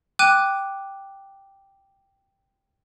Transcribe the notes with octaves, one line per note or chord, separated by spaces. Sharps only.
G5 D6 F#6 D#7